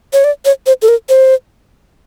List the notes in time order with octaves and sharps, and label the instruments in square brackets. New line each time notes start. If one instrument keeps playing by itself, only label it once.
[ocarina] C#5
D5
C#5
C5
A4
A#4
C5